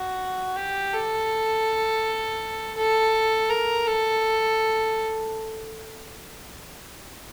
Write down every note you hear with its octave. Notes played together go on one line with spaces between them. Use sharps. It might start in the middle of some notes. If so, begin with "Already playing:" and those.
Already playing: F#4
G4
A4
A4
A#4
A4